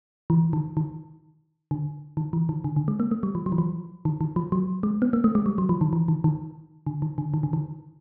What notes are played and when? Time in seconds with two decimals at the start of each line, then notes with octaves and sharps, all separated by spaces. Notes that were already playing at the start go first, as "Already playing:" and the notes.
0.30 E3
0.53 D#3
0.77 D#3
1.71 D3
2.17 D#3
2.33 E3
2.49 D#3
2.64 D3
2.76 D3
2.88 G#3
3.00 A#3
3.11 A3
3.23 G3
3.35 F3
3.46 F#3
3.52 E3
3.58 F3
4.05 D#3
4.21 D#3
4.36 F3
4.52 F#3
4.83 G#3
5.02 B3
5.13 A#3
5.24 A3
5.35 G#3
5.46 G3
5.58 F#3
5.69 F3
5.81 D#3
5.93 E3
6.08 D#3
6.24 D#3
6.87 D3
7.02 D#3
7.18 D3
7.34 D#3
7.43 D3
7.53 D#3